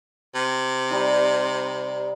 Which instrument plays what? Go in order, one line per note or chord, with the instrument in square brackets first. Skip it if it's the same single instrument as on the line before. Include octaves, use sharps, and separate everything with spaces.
[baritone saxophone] C3
[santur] G3 D#4